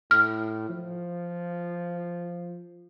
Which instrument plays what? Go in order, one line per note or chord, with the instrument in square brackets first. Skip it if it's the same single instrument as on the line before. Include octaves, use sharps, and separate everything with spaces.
[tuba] A2 [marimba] F6
[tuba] F3